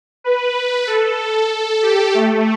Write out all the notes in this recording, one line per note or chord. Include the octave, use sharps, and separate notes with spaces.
B4
B4
A4
A4
A4
G4
A3